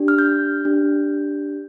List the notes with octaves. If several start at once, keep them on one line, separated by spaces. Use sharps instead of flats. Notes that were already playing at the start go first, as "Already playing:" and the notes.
Already playing: D4 G4
F6
G6
D4 G4